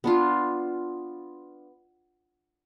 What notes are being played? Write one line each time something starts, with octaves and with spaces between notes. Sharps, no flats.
B3 D4 F4